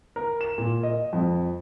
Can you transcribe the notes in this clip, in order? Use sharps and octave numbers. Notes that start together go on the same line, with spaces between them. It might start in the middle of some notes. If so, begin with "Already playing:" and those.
A#4
E7
A#2
D#5
F2